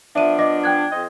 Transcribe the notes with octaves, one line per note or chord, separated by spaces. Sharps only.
F3 B3 D4 E5 D#7
D#5 D6 A#6
G5 F#6 G#6
F2 C5 D#5